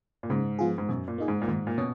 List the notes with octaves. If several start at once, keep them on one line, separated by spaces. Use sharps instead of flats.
A#2
G#2 C#3
F3 B3 F4 G#4
G#2
F#2 B2
A#2
A#3 D#4 G#4
G#2
A#2
G#2 D#3
A#2
B2 C#4